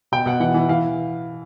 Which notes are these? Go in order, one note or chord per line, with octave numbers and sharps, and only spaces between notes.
B2 G5
B2 F#5
E3 F#5
E3
E3 F5